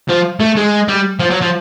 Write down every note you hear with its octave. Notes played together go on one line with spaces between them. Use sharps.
F3
A3
G#3
G3
F3
F#3
F3